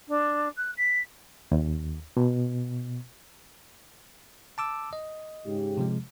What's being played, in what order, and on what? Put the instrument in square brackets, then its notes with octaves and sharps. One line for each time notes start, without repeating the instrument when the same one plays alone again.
[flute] D4
F#6
B6
[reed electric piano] D#2
B2
[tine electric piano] A5 D6 E6
D#5
[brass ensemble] G#2 C#3 G4
[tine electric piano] C3 F3 G#3